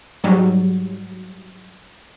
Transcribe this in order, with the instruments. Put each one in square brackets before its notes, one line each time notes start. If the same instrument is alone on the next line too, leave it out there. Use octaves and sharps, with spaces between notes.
[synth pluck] G#2 F#3 G3